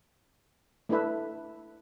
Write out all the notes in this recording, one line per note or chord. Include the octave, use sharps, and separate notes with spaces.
A3 D4 E4 B4 E5